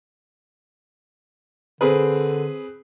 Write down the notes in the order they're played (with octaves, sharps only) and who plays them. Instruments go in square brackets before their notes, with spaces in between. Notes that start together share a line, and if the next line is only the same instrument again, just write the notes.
[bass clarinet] D3 [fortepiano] C4 G#4 B4